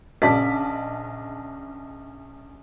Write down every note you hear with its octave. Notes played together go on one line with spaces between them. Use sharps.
A#1 C#3 D5 D#5 A5 B6